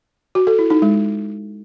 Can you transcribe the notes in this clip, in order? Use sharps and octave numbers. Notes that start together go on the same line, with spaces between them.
F#4
A4
E4
D#4
G#3